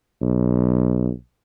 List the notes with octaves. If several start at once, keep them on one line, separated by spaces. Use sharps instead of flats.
B1